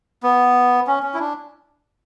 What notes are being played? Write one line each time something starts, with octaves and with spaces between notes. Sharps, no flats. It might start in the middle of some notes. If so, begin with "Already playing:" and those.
B3
C#4
C#4
E4
D4